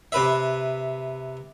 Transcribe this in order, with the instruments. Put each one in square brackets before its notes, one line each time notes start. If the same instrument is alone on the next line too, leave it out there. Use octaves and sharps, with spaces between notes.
[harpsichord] C3 B4 E5